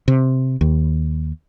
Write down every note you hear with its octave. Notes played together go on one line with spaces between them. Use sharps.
C3
D#2